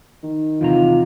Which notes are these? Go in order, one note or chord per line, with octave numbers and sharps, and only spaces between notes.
D#3
E2 C3 F4 A#5